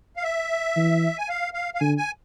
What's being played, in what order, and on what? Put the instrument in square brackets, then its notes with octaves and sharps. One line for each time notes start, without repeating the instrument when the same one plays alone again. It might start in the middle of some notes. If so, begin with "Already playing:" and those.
[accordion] F5
E5
[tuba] E3
[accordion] G#5
F5
F5
F5
[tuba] D3 [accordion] G#5
[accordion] G#5